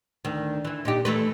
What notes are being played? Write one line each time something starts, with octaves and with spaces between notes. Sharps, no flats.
D2 D#3
E3 E4
A#2 D#4 G4
E3 A3 B4